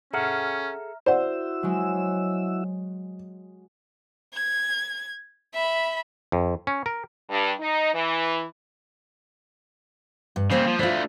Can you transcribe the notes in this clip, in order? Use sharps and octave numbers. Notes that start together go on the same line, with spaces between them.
C#4 G#4 A4 E5 F#5 A#5 F6
E4 F#4 C5 D5 F#5 E6
F#3 G#3
G#6
E5 B5
F2
C#4
A#4
G2
D#4
E3
G2
C#3 A#3 C4 C5 F5
F3
A3 D4 E4 F4 C5